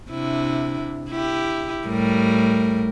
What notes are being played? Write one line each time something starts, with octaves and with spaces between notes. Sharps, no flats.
C3 D4 E4
E4 G4
A2 G3 A#4